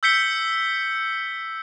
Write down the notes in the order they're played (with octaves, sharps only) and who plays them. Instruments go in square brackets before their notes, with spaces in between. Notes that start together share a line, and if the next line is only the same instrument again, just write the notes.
[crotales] E6 G6 B6 C#7 G7